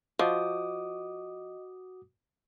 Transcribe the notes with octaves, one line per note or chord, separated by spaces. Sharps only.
F3 F#4 D#5 D6 D#6